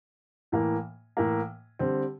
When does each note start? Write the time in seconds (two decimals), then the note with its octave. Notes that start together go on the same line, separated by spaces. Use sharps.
0.52 A2 E3 A#3
1.17 A2 E3 A#3
1.79 D3 G3 C4